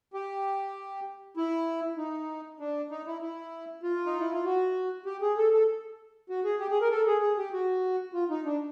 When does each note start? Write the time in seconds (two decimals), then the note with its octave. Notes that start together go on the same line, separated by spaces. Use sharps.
0.14 G4
1.37 E4
1.98 D#4
2.60 D4
2.91 D#4
3.07 E4
3.22 E4
3.83 F4
4.06 D#4
4.20 E4
4.32 F4
4.45 F#4
5.06 G4
5.22 G#4
5.37 A4
5.53 A4
6.29 F#4
6.45 G#4
6.60 G4
6.71 G#4
6.81 A#4
6.91 A4
7.07 G#4
7.21 G#4
7.38 G4
7.53 F#4
8.14 F4
8.30 D#4
8.46 D4